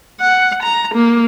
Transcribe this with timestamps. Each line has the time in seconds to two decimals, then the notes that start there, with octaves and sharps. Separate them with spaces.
0.20 F#5
0.63 A#5
0.95 A#3